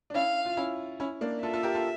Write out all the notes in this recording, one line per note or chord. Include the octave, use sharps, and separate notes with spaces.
D4
C#4 E4 F5
F4
C#4 E4
C#4 E4
A#3 D4
F4 A4 E5
F4 A4
G4 A#4
F4 A4